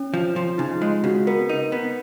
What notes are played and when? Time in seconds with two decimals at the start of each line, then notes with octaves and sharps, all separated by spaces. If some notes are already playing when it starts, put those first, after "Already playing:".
Already playing: C#4
0.14 F3
0.36 F3
0.58 C#3 D#4
0.81 G#3 F4
1.04 C#3 F#4
1.27 B3 A#4
1.49 D#4
1.72 B3